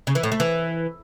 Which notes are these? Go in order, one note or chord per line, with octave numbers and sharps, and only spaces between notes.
C#3
E3
A2
A3
E3